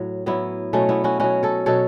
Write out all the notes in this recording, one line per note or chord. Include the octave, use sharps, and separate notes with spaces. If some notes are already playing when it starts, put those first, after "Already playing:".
Already playing: A2 F#3
A2 F#3 B3 E4
B2 F#3 A3 C#4
B3 E4
C#4 F#4
B2 F#3 C#4 F#4
A4 C#5
B2 F#3 A4 C#5